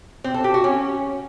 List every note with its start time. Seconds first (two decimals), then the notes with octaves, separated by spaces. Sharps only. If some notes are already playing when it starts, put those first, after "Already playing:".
0.24 C4
0.34 A4
0.44 G4
0.54 F#4
0.64 C#4